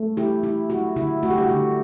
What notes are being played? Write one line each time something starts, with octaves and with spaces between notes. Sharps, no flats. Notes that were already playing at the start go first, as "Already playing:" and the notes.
Already playing: A3
E4 G4
E4
E4 F#4
D3 E4
A3 F#4
G4
F#4
D3 G4